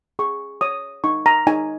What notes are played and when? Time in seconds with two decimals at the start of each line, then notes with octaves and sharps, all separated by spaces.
0.19 G#4 C#6
0.61 C#5 D#6
1.04 D#4 C#6
1.26 A#5
1.47 D#4 G#5